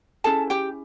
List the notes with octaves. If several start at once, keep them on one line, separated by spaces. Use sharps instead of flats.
C#4 E4 G#4 A4 A5
G4 G5